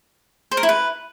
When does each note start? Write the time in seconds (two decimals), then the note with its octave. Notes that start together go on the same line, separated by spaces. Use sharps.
0.51 C5
0.57 A#4
0.63 E4
0.69 B4